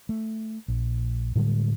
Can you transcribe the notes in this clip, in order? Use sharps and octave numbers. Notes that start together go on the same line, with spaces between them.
A3
A#1
A2 D3 G3 G#3